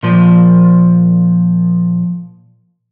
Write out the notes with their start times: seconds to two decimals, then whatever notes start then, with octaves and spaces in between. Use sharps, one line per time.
0.03 A#2 F3